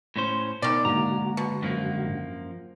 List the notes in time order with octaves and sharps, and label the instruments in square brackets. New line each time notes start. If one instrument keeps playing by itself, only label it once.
[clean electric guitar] A2 C#4 C5
[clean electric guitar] B2 [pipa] D#3 D5
[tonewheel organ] G#2 D3 F#4 [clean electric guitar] A#3 A#5
[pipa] B2
[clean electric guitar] F#2 F3 A#3